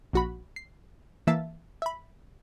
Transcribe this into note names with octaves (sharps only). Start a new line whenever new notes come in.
A#1 F#4 B5
C7
E3 A#3 E5 F5 A5 A6
E5 B5